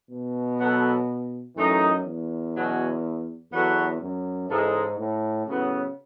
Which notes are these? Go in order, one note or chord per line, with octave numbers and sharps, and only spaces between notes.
B2
F#3 B3 F#4 A4
F#2 E3 A3 D#4
E2
B2 F#3 C#4
E2 F#3 B3 F#4 A4
F#2
G#2 C#3 E3 G#3 D#4 A4
A2
A2 C#3 F#3 B3